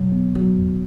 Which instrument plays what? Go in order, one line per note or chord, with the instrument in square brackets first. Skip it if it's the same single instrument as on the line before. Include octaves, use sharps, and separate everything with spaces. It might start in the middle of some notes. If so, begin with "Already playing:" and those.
Already playing: [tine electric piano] B2 [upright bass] F#3
[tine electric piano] B3
[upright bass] F#3 [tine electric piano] F#4
[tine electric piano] E2